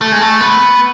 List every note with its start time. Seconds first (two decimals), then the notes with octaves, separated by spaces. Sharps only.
0.01 A3
0.12 G#3
0.21 A3
0.41 B3